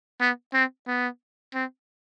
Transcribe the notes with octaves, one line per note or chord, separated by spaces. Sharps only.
B3
C4
B3
C4